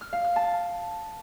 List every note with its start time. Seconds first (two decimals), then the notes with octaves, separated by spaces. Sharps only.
0.01 F6
0.13 F5
0.24 F6
0.36 A5